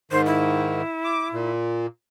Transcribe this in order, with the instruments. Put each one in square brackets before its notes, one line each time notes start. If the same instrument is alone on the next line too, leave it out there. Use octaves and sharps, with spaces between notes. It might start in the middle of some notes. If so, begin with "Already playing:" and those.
[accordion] G#2 D#3 [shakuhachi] C5
[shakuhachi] E4
[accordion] D6
A#2